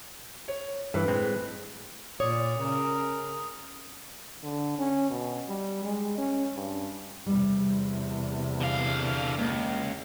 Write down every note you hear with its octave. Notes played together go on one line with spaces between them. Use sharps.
C#5
G2 E3 B4
A2 G#3 C4
A#2 C#5 D5 D#6
C#3 A#4
D3
C#4
B2
G3
G#3
C#4
G2
E2 C3 G3
D3 F5
C#2 A#3